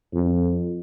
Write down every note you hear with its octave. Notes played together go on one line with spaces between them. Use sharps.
F2